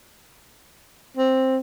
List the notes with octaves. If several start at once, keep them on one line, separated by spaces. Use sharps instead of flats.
C4